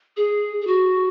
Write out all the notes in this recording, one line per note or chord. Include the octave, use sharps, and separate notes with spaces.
G#4
G#4
F#4